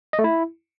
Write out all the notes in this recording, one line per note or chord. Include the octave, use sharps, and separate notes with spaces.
D#5
A3
E4